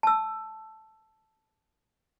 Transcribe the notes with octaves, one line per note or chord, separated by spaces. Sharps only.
A5 E6